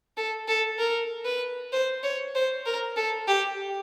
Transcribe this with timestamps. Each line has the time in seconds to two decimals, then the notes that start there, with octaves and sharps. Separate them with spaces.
0.17 A4
0.48 A4
0.79 A#4
1.25 B4
1.73 C5
2.03 C#5
2.35 C5
2.66 A#4
2.97 A4
3.28 G4